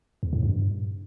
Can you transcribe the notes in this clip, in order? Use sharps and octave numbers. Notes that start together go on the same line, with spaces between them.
E2
A2
G2